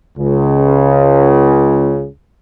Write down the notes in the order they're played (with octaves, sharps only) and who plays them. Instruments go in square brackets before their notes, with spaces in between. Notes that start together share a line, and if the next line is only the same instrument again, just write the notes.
[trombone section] C#2 C#3